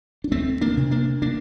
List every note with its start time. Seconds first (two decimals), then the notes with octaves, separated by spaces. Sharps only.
0.24 D4
0.31 D2 A3 C4
0.61 A#3 D4
0.77 C3
0.91 A#3 D4
1.22 A#3 D4